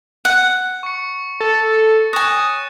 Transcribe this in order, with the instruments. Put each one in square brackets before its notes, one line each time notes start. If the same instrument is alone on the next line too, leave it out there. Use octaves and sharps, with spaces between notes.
[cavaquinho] F#5
[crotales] C#6 C#7
[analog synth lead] A4 [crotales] A6
[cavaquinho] C#5 G#5 [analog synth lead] D#6 [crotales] F#6 A#6 E7